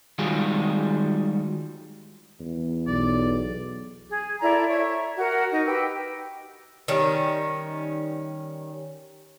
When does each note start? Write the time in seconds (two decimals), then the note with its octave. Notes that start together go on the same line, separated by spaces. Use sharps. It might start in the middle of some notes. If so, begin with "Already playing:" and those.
0.18 D#3 G3 G#3 F4 F#4 G#4
2.40 E2
2.87 B1 D5
4.10 G#4
4.42 E4 A4 D5 A#5
4.68 C#5 E5
5.17 F#4 A#4 F#5
5.51 D#4
5.66 G4 B4 E6
6.88 D#3 G3 C#4